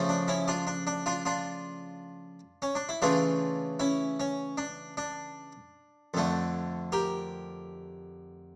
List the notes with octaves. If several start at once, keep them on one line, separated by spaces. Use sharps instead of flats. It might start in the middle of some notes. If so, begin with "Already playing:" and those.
Already playing: C#3 F3 A3
D4
C#4 E4
D4 F4
D4
D4
D4 F4
D4 F4
C#4
D4
E4
C#3 E3 A3 D4 F4
C#4 E4
C#4
D4
D4
F2 D3 A3
G4 A#4